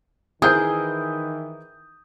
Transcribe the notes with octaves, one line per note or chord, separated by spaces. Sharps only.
D#3 E3 E4 G#4 A#4 C5 D#6 G6